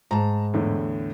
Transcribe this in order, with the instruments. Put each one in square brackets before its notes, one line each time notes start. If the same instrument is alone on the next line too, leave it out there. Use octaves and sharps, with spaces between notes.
[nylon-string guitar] G#2 [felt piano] A5 A#5
[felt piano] E2 A2 D3